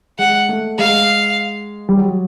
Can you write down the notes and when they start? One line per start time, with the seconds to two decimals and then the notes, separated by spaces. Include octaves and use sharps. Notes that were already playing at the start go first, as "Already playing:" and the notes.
0.19 G#3 F#5
0.49 A3
0.79 G#3 F5
1.89 G3
1.97 F#3